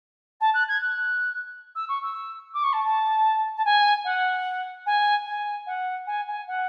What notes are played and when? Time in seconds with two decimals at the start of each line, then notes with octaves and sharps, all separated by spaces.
0.40 A5
0.54 F#6
0.68 G#6
0.81 F#6
1.75 E6
1.89 C#6
2.02 E6
2.53 D6
2.63 C#6
2.73 A5
2.84 A5
3.57 A5
3.65 G#5
4.04 F#5
4.86 G#5
5.26 G#5
5.66 F#5
6.06 G#5
6.27 G#5
6.47 F#5